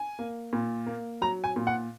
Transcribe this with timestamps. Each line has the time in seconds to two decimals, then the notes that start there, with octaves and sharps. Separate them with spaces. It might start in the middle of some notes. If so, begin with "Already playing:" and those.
Already playing: G#5
0.19 A#3
0.53 A#2
0.86 A#3
1.21 F#3 A#5
1.44 G#5
1.56 A#2
1.67 F#5